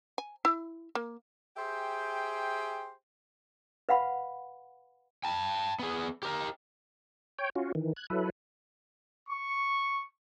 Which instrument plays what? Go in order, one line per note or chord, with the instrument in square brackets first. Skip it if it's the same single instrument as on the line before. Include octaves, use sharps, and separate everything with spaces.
[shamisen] G#5
E4
A#3
[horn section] G4 G#4 C5 E5 G5
[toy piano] B4 F5 F#5 B5
[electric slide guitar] G5 A5
B3 G#4
G4 A#4
[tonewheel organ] C#5 G5
C#4 F4 F#4
D#3 E3
F#6 G#6
F#3 E4 A4 B4
[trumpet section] C#6